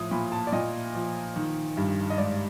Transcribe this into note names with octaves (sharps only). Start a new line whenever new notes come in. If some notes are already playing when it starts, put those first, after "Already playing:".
Already playing: A2 F3 D#6
A#2 B5
A5
D5
A#2 D#5
F3
D#3
G2
D#5
G#2 D5